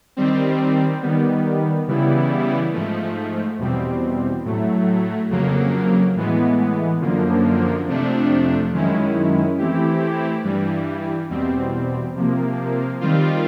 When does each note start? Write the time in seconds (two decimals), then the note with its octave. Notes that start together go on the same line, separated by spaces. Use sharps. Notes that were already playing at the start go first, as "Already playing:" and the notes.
0.17 D#3 G3 C4
1.02 D#3 G3 B3
1.87 C#3 E3 G3 B3 E4
2.73 G#2 F3 A3
3.59 E2 B2 G3 C4
4.45 A2 F#3 A3
5.30 F2 C#3 F#3 A#3
6.16 A2 E3 G#3 B3
7.01 F#2 D3 F3 A#3
7.87 F2 C3 F3 A3 D4
8.73 F#2 D#3 G#3 C#4 E4
9.58 E3 A3 C4 E4 G4
10.43 G2 E3 G3
11.29 E2 B2 G3 C4
12.15 C3 F3 A#3
13.01 D#3 G3 C4 F4